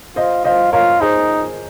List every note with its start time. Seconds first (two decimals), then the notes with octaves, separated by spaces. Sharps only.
0.16 F4 C5 D#5
0.45 F4 C5 D#5
0.73 F4 A#4 C#5
1.01 D#4 G#4 C5